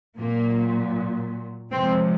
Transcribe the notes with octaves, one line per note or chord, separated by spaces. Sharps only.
A#2 F#3 A#3
C3 F3 G#3 C4